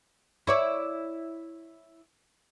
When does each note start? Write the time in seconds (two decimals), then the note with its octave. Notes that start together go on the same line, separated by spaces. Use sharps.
0.47 E4 C#5 D5